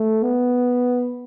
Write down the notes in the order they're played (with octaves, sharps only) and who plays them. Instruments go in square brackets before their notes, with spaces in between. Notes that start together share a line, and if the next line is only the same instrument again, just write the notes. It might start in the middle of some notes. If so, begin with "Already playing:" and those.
Already playing: [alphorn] A3
B3